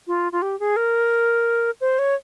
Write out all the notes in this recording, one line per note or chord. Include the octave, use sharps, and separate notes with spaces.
F4
F4
G4
G#4
A#4
C5
C#5